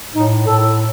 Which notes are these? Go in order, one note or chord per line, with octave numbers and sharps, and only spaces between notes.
A2 D#4
A2 A4